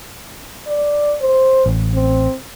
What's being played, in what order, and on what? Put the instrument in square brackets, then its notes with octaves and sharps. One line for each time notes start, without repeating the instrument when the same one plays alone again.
[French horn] D5
C5
[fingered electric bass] A1
[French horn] C4